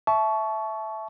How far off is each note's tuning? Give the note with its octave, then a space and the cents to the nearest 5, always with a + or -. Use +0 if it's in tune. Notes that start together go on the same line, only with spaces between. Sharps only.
E5 +0 A5 -25 C#6 +10